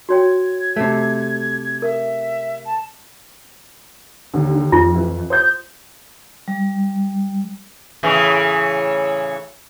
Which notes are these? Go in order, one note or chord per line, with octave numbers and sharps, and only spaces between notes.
F#4 C#5 G5 G#6
C3 A3
A#4 E5
A5
D#2 D3
F2 F4
E3
C5 D#6 G6
G3
A2 C#3 E3